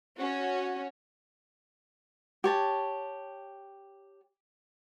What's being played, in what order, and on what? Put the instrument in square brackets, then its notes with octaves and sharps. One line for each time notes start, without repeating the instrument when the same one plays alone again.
[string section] C#4 F#4
[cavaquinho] G4 C#5 A5